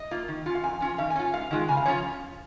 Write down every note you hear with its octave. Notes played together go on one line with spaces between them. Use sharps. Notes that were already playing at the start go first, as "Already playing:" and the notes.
Already playing: D#5
A#3 F4
D#3
C#4 F4
F5
F2 G#5
F3 C#4 F4
D#3 F5
G#5
C#4 F4
G#2 F5
D#3 G#3 F4
C#3 G#5
F5
F3 C#4 F4 C#5